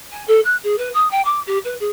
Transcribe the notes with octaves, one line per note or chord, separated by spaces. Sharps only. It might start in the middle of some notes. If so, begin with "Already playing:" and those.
G#5
A4
F#6
G#4
B4
D#6
G5
D6
G4
B4
G#4